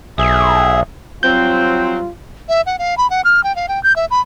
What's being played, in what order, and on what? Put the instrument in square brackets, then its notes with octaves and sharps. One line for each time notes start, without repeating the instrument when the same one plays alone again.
[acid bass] B1 [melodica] G#4 E5
[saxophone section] F#3 C4 [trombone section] G3 F4 [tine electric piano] G6
[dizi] E5
F#5
F5
B5
F#5
F6
G5
F5
G5
G6
E5
B5